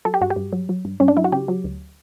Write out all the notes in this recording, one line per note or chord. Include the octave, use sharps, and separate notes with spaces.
F#3 A4
G4
G2 F#4
G4
G2
F#3
F#3
G2
G2 C#4
D4
F#3 E4
F#4
C#3 G4
F#3
D2